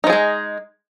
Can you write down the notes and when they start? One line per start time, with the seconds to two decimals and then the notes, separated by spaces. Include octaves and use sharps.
0.04 D#4
0.07 F3
0.10 G#4
0.13 G#3